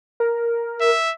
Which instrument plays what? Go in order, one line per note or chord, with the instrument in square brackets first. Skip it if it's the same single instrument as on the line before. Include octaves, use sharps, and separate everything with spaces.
[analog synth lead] A#4
[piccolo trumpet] E5